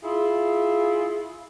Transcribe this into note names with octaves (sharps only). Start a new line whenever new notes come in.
E4 F4 G#4